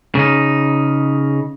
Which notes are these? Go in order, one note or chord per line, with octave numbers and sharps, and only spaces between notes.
C#3 D#4